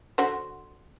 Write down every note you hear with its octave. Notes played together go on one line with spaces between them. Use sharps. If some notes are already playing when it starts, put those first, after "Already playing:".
D3 F#4 C5